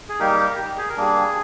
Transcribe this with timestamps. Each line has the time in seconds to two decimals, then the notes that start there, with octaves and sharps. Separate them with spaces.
0.09 G#4
0.19 G3 A#3 D#4 G4 A#4
0.39 G4 A#4
0.58 G4
0.78 G#4
0.89 A#4
0.97 G3 A#3 D4 G#4